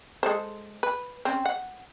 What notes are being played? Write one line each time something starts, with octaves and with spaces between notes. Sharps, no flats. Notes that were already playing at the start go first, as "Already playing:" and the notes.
G#3 A4 C5
B4
C4 C#4
F#5